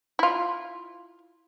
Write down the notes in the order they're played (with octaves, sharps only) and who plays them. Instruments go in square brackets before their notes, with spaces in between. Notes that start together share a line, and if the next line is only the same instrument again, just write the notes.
[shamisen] E4 F4